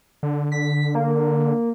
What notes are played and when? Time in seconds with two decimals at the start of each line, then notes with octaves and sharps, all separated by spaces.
0.23 D3
0.52 B6
0.95 A#3